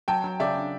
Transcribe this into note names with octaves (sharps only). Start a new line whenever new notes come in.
F#3 G5 A5
F#3
C#3 D5 E5
D4